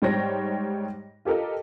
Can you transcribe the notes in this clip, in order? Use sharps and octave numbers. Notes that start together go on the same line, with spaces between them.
G#2 G3 C5 C#5 G5 A#6
F4 G4 A4 A#4 D#5